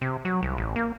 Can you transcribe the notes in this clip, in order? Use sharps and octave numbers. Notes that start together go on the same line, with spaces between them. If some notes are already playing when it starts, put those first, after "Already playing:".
C3
F#3
C2
A1
A#3